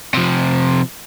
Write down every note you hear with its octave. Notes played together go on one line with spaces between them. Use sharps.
C3 F3